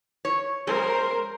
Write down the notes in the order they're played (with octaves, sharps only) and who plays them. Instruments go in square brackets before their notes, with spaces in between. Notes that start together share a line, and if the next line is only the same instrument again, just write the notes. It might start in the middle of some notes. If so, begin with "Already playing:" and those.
[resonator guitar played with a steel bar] C#5
[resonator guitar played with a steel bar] G#3 [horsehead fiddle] A#4 C5